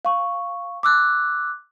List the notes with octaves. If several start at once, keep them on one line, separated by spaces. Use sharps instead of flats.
F5 C#6
D6 E6 F#6